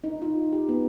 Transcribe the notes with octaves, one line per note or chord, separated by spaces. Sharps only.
D#4
F4
G4
B3